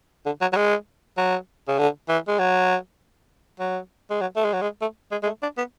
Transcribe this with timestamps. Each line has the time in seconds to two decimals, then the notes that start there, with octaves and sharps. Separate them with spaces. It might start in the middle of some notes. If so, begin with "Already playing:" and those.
0.26 D3
0.41 F#3
0.53 F#3
0.56 G#3
1.18 F#3
1.68 C#3
1.79 D3
2.09 E3
2.28 G#3
2.39 F#3
3.59 F#3
4.10 G#3
4.21 F#3
4.36 A3
4.44 G#3
4.53 F#3
4.62 G#3
4.82 A3
5.11 G#3
5.23 G#3
5.26 A3
5.42 D4
5.58 B3